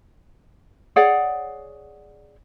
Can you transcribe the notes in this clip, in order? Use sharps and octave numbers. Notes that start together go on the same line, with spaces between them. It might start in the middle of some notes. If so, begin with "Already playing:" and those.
G#4 C#5 D5 F#5